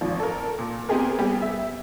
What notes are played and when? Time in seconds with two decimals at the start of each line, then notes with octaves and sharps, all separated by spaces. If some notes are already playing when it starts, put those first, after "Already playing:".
0.01 G#1 F3
0.20 A4 A#4
0.58 A#2
0.89 B3 C4 G4 G#4 A#4
1.19 G3 B3 G4 G#4
1.42 E5